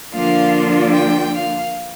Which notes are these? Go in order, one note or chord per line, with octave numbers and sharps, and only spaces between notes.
D3 F3 A#3 D4 F4 F5
G5
F5